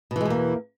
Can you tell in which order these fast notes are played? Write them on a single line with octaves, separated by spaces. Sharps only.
B2 E3 G#3 E2 A#3